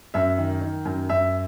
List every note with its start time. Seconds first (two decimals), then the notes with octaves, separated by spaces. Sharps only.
0.14 F#2 E5
0.38 D#3
0.61 D#3
0.85 F#2
1.09 F#2 E5